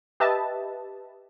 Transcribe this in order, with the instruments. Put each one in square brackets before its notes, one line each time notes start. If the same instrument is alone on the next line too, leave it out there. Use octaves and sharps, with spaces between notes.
[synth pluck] G4 B4 D#5 E5 A5